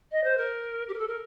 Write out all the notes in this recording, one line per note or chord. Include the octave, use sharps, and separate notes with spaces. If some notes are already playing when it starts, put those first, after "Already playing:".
D#5
C5
A#4
G4
A#4
A4
A#4